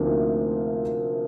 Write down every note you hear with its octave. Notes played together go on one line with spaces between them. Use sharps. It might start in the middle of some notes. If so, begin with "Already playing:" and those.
Already playing: D2 C3 F3 A#3 D#4